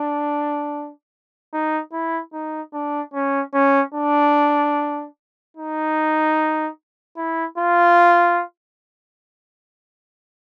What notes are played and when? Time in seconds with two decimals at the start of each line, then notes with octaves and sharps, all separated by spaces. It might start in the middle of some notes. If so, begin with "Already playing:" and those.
Already playing: D4
1.53 D#4
1.93 E4
2.33 D#4
2.74 D4
3.14 C#4
3.54 C#4
3.94 D4
5.57 D#4
7.17 E4
7.58 F4